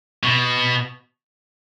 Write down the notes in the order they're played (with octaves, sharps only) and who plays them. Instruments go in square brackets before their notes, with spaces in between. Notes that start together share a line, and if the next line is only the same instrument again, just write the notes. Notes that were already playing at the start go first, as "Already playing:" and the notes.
[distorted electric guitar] B2